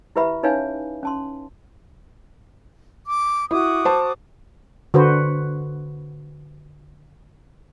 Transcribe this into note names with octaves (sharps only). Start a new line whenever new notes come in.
E4 G4 B4 E5 B5
C#4 D#4 B4 C#5 F5 G#5
C#4 A5 C6
D6
E4 F#4 D6 D#6
C5 A5
D3 F#4 B4 C5